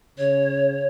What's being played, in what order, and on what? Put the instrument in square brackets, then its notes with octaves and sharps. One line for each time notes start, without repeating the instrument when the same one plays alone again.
[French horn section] C#3 [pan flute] C#5